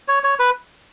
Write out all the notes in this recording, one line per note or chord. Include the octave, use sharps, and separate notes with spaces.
C#5
C#5
B4